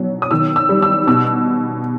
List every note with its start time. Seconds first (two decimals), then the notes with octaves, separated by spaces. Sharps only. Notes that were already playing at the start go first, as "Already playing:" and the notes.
Already playing: B2 F#3
0.22 D#6
0.31 D#3 E6
0.56 E6
0.69 G3
0.82 E6
1.07 B2 E6